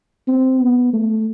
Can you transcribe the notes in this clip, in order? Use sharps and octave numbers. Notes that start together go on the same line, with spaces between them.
C4
B3
A3